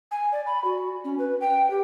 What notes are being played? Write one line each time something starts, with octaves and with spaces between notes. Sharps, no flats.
G#5
D5
B5
F#4
C#4
B4
G5
G4